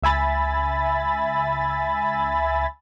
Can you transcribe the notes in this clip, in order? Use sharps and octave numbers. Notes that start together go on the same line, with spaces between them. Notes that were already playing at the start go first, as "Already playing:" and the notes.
C#2 E5 G#5 B5 A6